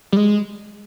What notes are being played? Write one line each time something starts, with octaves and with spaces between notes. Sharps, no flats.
G3
G#3